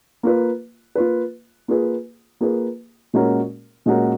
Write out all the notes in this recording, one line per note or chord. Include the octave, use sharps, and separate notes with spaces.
A#3 F4 B4
A#3 F4 B4
A#3 F4 G#4 B4
A#3 F4 G#4 B4
A#2 G#3 C#4 F#4 A#4
A#2 G#3 C#4 F#4 A#4